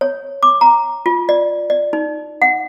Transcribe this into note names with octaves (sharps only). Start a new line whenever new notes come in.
C#5
D6
A#5
F4
D5
D5
D#4
F#5